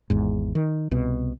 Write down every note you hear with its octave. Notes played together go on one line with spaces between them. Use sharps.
G#1 E2 G#2
D#3
C2 B2